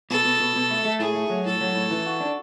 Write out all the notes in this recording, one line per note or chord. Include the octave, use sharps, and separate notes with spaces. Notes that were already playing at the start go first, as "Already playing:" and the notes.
B2 A4
B2
B2
B2
A3
A3
A2 G#4
A3
F#3
A2 A4
F#3
A2
E3
F#4
D4